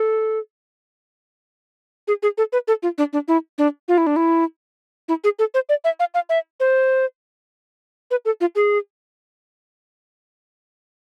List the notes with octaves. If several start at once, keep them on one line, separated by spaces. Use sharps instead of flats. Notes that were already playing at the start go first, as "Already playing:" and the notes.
Already playing: A4
G#4
G#4
A4
B4
A4
F4
D4
D4
E4
D4
F4
E4
D4
E4
E4
G#4
A4
C5
D5
E5
F5
F5
E5
C5
B4
A4
F4
G#4